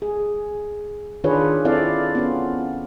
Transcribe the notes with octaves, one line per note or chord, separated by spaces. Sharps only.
G#4
D#3 D4 F4 G#4 B4 C#5
C4 E4 F4 A4 D5 F5
B3 C#4 F4